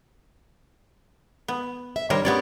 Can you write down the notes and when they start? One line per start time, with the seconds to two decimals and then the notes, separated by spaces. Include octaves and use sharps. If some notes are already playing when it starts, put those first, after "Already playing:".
1.48 B3
1.96 E5
2.10 G2 D#3 G3 A#4 C5 C#5
2.25 B3 C#4 G4 A#4 C#5 D5